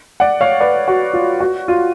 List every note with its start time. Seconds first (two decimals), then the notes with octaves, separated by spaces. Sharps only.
0.20 D5 F#5
0.41 C#5 F5
0.60 B4 D5
0.88 F#4
1.14 F4
1.41 F#4
1.68 F4